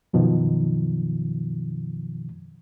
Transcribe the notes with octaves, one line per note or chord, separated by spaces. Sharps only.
F#2 B2 D#3 F3